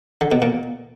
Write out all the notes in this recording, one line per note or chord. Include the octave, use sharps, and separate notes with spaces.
D3
B2
A#2